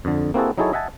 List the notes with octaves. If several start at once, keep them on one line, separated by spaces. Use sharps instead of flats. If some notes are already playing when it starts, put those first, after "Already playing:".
F2 D3
A#3 C4 E4 F#4 G#4 A4
F#3 D#4 E4 G#4 A4 C#5
D#5 E5 F#5 G#5 A5